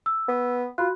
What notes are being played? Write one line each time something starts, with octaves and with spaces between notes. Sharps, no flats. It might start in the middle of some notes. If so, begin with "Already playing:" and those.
E6
B3
F4 F#4 B5 F#6